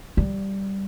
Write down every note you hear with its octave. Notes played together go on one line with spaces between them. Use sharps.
G3